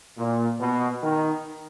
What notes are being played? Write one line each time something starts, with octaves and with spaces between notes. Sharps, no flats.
A#2
B2
D#3